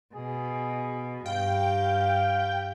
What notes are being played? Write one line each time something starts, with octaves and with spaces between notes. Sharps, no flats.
B2 G#4
G2 G4 F5 G5